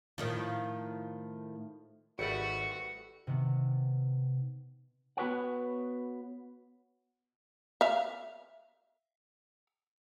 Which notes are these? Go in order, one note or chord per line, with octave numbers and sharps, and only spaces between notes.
A2 D#3 F3
G#1 G3 A3 B3 F#4 D5 C#7
C3 D#3 B3
B3 F#4 B4 C#5 F#5
E5 F5